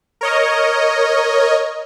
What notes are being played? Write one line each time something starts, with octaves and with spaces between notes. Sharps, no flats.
A#4 C#5 D#5